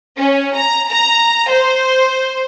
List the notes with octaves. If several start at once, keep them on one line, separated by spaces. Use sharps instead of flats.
C#4
A#5
A#5
C5